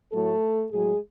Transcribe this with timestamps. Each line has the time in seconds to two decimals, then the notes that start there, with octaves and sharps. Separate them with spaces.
0.12 A2 F#3 A3 A4
0.71 A2 F#3 G#3 G#4